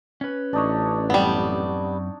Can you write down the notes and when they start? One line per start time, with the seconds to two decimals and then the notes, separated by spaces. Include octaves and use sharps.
0.21 C#4 B4
0.53 A1 D4 D#4 C#5
1.10 F#2 G3 B3 C4 D5